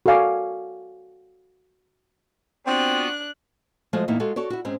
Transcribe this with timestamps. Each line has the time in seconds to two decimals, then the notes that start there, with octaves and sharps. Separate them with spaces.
0.06 F#4 A4 D5 F5 G#5 D6
2.66 B3 C4 D4 F4 F#4 F#6
3.93 F3 G#3 A3 F#4 D#5
4.08 E2 A2 A#3 D#4 E4
4.20 G#3 F4 F#4 A4
4.36 F#4 A4 C#5 D5
4.50 E4 F#4
4.65 G#2 G#3 C4 C#4